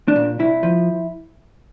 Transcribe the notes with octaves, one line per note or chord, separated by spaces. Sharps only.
D4
A#2
C2 E4
F3